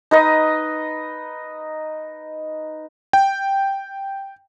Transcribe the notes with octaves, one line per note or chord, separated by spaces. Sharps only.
D#4 B4 D#5
G5